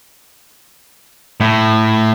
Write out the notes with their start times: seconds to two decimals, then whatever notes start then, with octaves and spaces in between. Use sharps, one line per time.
1.41 A2